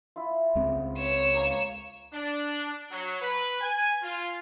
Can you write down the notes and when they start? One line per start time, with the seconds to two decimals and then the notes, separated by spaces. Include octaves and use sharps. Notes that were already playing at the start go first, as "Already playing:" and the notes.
0.16 E4 F4
0.55 C#2 G#3 C4
0.98 C#5 E7
1.34 A#3 A#4 A#5
2.14 D4
2.91 F#3
3.21 B4
3.61 G#5
4.03 F4